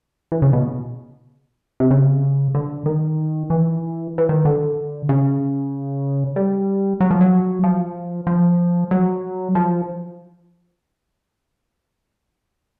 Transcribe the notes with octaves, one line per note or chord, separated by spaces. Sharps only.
E3
C#3
B2
C3
C#3
D3
D#3
E3
E3
D#3
D3
C#3
G3
F#3
F3
F#3
F3
F3
F#3
F3